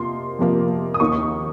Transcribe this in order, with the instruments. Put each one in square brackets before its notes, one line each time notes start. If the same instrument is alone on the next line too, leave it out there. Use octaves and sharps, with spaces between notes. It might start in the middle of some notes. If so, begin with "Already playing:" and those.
Already playing: [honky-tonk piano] F2 C3 F3 A#3 C6
F2 C3 F3 A#3
D#6
D#2 D#3 A#3 D#4 C#6